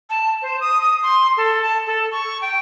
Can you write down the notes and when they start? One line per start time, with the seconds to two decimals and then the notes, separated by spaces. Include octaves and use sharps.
0.10 A5
0.42 C5
0.60 D#6
0.81 D#6
1.03 C6
1.37 A4
1.62 A5
1.87 A4
2.12 C#6
2.42 G5